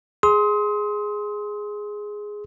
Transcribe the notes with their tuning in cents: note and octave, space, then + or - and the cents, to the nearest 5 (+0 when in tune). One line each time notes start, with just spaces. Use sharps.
G#4 +0 C6 +0 D#6 +35